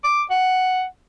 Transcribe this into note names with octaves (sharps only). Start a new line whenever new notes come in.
D6
F#5